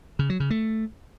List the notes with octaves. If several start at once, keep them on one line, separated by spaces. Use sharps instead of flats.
C#3
F#3
C#3
A3